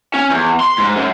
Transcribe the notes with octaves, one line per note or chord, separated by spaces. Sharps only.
C#4
E2
C6
G#2
F#2